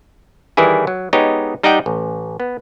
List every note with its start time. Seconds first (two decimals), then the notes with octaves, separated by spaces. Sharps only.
0.57 D#3 E3 G3 E4 G#4
0.87 F#3
1.13 G#3 B3 D#4 G4 C#5
1.63 G3 D#4 G4 D#5 F#5 G5
1.86 A1
2.40 B3